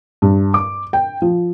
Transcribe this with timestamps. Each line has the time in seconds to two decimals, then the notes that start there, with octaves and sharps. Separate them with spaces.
0.22 G2
0.54 D6
0.93 G5
1.22 F3